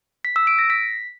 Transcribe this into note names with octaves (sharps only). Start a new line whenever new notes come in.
B6
E6
D7
A#6
B6